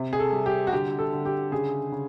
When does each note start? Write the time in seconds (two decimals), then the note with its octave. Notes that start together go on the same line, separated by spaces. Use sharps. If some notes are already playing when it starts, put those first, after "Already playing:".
Already playing: C3
0.13 G#4
0.19 A4
0.32 G3
0.46 G4
0.67 F#4
0.72 D3 G4
0.99 A4
1.12 D3
1.25 G4
1.52 C#3 G#4
1.92 C#3